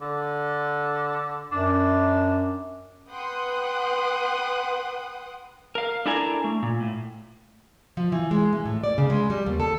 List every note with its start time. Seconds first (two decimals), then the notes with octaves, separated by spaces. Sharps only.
0.01 D3
1.52 F#2 D4
3.11 B4 F#5 G5 C6 D#6 F#6
5.75 A#4 F5
6.06 D4 E4 A4 A#4 G#5 A#5
6.44 A3
6.62 A#2
6.80 A2
7.97 F3
8.12 E3
8.31 G#3
8.53 E3
8.65 A2
8.84 D5
8.98 C#3
9.10 G#3
9.30 G3
9.46 D#2
9.60 A4